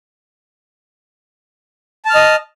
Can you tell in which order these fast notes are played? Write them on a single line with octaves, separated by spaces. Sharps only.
A5 F6 D#5